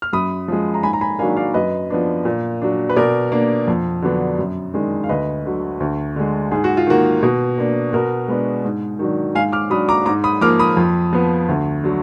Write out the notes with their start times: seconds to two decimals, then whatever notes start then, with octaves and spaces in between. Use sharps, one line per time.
0.02 F6
0.13 F#2 B5 D#6
0.48 F3 G#3
0.74 A#5
0.83 G#2 G#5 B5
0.93 A#5
1.01 G#5 B5
1.19 D#3 F#3 A#3 D4 F5 G#5
1.37 D5 F5
1.54 F#2 B4 D#5
1.90 F3 B3 D4
2.25 A#2
2.62 F#3 D4
2.90 B4
2.96 B2 A#4 D5
3.32 A#3 D4
3.67 F2
4.02 D3 F#3 B3 D4
4.39 F#2
4.74 D#3 G#3 D4
5.04 F5
5.09 D2 B4 D#5
5.45 D3 F#3
5.80 D2
6.16 D3 G#3
6.51 G#2 G#4
6.64 F#4
6.77 F4
6.87 D#3 A#3 F#4
7.23 B2
7.58 A#3 D4
7.93 B2 F#4 A#4
8.28 G#3 B3 D4
8.65 G#2
8.99 D#3 F#3 D4
9.35 G#2 F5 G#5
9.53 D6 F6
9.70 F#3 D4 B5 D#6
9.89 A#5 D6
10.06 G#2 A#5 D6
10.24 B5 D#6
10.41 F3 A#3 D6 F6
10.59 B5 D#6
10.77 F2
11.13 F3 B3
11.49 D2
11.84 D3 F#3